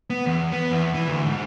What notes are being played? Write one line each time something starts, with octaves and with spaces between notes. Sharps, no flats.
B3
E2
B3
E2
E3
D2
G#2